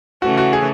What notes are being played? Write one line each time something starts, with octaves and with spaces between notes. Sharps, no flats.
C#3 E3 A3 C#4 F#4
F#4
G#4